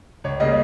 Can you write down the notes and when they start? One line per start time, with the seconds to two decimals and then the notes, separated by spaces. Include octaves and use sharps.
0.24 C#2 C#5
0.40 C#3 G3 A#3 D#5